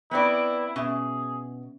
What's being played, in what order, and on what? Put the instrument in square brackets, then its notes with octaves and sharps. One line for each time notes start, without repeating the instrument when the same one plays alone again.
[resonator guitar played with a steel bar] B3 C4 D5 [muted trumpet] E4
[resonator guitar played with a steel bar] B2 [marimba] C#4 E5 [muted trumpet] G#4